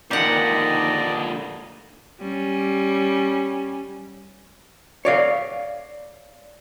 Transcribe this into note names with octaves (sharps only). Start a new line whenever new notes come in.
A#2 D3 D#3 G4 D5 D#5 F#5
G3 C#4
C#5 D5 F5